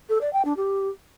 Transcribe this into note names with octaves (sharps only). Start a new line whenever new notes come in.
A4
D5
G5
D4
G4